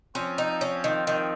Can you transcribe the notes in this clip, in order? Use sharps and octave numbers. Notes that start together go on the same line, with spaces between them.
F3 C4 C#4 F4
D#4
C#4
D#3
D#3